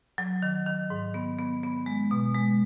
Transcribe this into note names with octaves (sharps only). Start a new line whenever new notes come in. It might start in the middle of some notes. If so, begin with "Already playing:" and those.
F#3
D#3
D#3
G#2
B3
B3
B3
G#3
B2
G#3